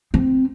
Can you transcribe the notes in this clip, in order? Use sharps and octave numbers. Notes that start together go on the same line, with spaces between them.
C4